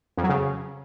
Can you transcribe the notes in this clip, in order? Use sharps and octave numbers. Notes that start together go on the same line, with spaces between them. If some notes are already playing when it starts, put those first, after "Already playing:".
F2
F#3
C#3